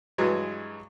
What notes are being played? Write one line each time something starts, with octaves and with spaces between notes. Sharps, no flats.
G2 E3 F#3 G#3